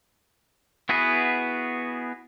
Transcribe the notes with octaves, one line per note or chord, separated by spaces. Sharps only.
B3 E4 F#4 G#4 B4